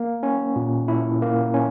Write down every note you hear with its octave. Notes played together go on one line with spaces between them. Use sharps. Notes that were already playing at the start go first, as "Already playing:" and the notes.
Already playing: A#3
C#4
A#2
E4
A#3
C#4